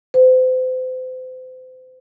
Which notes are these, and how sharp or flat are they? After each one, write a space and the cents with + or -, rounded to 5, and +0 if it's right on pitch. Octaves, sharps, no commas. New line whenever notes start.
C5 -35